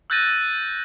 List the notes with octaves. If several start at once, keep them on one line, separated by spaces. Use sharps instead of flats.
E6 F#6 G6 A6 A#6 D#7